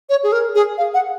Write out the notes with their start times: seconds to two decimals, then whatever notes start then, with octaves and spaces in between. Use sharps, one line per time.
0.09 C#5
0.23 G#4
0.32 A#4
0.55 G#4
0.78 F5
0.94 F#5